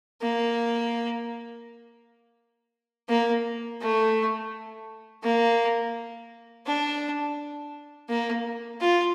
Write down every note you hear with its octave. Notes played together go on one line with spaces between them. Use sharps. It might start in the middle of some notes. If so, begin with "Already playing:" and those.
A#3
A#3
A3
A#3
D4
A#3
F4